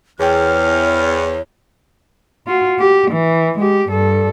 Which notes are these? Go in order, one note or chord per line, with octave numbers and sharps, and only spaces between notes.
E2 G#4 C#5 G5 F6
F4 F#4
G4
E3
G#3 G4
G2 A4